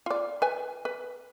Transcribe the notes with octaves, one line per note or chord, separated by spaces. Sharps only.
F4 D5
B4 G#5
B4